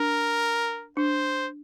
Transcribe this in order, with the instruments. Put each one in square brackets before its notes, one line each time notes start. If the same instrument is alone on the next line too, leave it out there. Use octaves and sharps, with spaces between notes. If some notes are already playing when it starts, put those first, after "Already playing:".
Already playing: [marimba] D4 [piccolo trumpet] A#4
[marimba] D4 [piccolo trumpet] C5